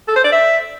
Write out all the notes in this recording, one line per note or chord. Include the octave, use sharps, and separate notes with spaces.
A4
C5
D5
E5